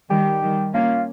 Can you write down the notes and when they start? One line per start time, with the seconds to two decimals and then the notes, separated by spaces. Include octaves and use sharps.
0.10 D#3 G3 G4
0.42 D#3 G3
0.74 A#3 C#4 F4